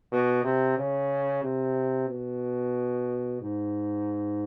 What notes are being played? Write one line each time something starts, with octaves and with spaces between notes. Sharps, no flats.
B2
C3
C#3
C3
B2
G#2